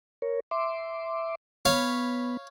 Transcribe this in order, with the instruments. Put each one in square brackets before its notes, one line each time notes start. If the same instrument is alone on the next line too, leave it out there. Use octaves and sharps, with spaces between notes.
[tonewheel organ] A#4 C#5
E5 C6 D6
[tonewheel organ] B3 B5 [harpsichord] C#5 F5